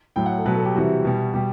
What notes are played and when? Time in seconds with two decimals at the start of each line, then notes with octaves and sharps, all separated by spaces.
0.16 A2 F#3 G5
0.26 F#5
0.38 A4
0.45 B2 F#3 B4
0.55 A4
0.65 G4
0.75 C3 E3 G3 F#4
1.05 B2 G3
1.34 B2 G3 G4